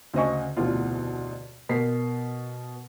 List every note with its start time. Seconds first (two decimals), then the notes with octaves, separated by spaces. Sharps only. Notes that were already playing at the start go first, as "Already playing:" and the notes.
0.14 D2 C#3 C5 D#5 G#5 C#6
0.57 F1 D2 B2 E3 F4
1.69 B2 A#4 B6 C7